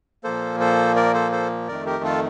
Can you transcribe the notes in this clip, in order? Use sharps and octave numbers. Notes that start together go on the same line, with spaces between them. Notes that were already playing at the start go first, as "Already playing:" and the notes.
A#2 F3 A#3 A4 C5
A4 C5
A#4 D5
A4 C5
A4 C5
F2 D#3 A3 A#4 D5
G4 A#4
F4 A4